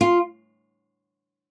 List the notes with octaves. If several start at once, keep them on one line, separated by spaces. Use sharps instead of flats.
F4